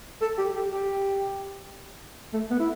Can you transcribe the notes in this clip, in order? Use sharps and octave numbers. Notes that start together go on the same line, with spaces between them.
A4
G4
G4
G4
A3
B3
E4